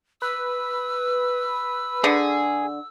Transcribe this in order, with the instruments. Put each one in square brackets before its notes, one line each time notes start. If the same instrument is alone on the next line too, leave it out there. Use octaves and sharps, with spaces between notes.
[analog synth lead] B4 [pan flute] E6
[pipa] D3 [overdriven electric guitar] G#4